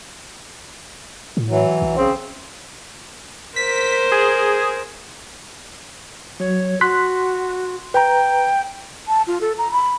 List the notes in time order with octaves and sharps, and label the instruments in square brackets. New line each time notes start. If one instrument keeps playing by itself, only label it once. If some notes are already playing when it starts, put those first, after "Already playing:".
[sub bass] A2
[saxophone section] E3 F#3
[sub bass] B1
[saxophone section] C#3 C4
[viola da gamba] A#4 C5 [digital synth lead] B6
[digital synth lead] G#4
[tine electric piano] F#3 [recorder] C#5
[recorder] F#4 [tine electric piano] C6 F#6 B6
[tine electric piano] B4 A#5 [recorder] G5
[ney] A5
F4
A4
A#5
B5